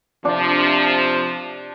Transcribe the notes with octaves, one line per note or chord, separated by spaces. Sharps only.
C3 F3 D4